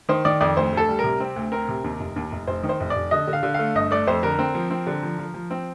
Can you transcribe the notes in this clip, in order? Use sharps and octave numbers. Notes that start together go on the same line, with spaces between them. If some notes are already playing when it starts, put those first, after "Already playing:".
D#3 C5
D#3 D5
F2 D5
D2 C5
D2
A4
G3
C3 A#4
C4
D2
C4 A#4
C3
D#2
F1
D#2
F1
F1 C5
D#3
C5
F1
F1 D5
D3 D#5
D3
F5
D3
A3 F5
G1 D#5
A3 D5
F2 C5
D3 A#4
C4
F3
C4
D3
F3
F3
F3
C4